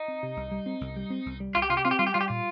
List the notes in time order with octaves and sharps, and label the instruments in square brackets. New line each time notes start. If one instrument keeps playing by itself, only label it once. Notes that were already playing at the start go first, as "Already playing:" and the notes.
Already playing: [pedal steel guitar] D#4
[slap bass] C4
C3
C2
G3
C4
C2
G3
C4
C2
G3
[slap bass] C2 [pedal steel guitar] F4
[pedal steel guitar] G4
[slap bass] C3 [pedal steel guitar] F4
[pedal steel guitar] G4
[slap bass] C4 [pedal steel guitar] F4
[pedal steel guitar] G4
[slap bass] G3 [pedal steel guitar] F4
[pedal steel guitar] G4
[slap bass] G3 [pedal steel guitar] F4
[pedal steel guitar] G4
[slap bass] A#2 [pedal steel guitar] F4